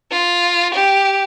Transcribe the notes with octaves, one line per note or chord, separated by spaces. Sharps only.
F4
G4